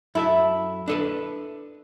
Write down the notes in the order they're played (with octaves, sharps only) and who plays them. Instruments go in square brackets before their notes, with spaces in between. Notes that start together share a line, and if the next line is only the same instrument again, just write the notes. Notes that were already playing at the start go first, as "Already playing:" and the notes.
[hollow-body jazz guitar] F#2 A4 E5 [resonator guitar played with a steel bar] E4
[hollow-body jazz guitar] D4 A4 B4